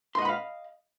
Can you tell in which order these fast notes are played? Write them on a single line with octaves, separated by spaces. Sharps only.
C6 D#5 F#5 B5 F5